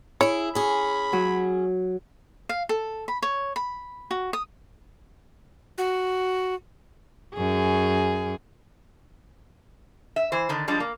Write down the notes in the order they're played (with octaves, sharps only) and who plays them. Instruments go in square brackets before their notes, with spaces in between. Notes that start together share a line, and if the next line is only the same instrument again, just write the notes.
[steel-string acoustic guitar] E4 G#4 [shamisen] C#5
[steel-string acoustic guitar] C#4 G#4 [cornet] B5
[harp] F#3
[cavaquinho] F5
A4
B5
C#5
B5
F#4
D#6
[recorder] F#4
[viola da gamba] F#2 G#4
[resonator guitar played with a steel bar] E5
E3 C5
D3 D#3 D4
F3 G3 G#3 D4
A#3